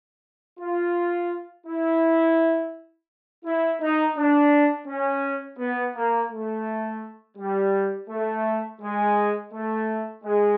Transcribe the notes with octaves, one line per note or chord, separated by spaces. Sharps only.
F4
E4
E4
D#4
D4
C#4
B3
A#3
A3
G3
A3
G#3
A3
G#3